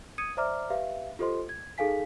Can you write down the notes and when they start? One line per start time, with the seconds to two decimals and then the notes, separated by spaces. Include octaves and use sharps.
0.18 D#6 G#6 C#7 D#7
0.37 C5 D5 E5 A#5 D6 F6
0.70 G4 B4 E5 F5
1.19 F4 G4 A4 C5 D#5 C6
1.49 G#6
1.78 D#4 G#4 A4 F5 G#5 B6